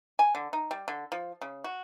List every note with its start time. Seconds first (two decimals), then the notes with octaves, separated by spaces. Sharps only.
0.19 G#5
0.35 D3
0.53 D#4
0.71 G3
0.88 D3
1.12 F3
1.41 C#3
1.64 F#4